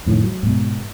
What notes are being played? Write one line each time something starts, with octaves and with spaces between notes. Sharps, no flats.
F2 A2 D#3
F#3
G#2 B2